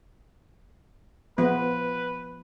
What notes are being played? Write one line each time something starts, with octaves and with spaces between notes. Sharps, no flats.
F3 B3 B4